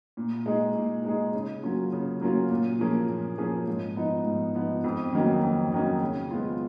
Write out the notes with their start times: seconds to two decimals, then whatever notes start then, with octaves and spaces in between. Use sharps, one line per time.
0.17 A#2
0.46 G#3 D#4 G#4
0.75 A#2
1.05 G#3 D#4 G#4
1.34 C#3
1.63 F#3 A#3 C#4 F4
1.92 C#3
2.21 F#3 A#3 C#4 F4
2.50 A#2
2.79 F3 A#3 C#4 G#4
3.08 A#2
3.38 F3 A#3 C#4 G#4
3.68 G#2
3.96 F3 B3 D#4
4.26 G#2
4.55 F3 B3 D#4
4.84 F2
5.13 D#3 F#3 A#3 C#4
5.43 F2
5.72 D#3 F#3 A#3 C#4
6.02 C#3
6.31 G#3 B3 F4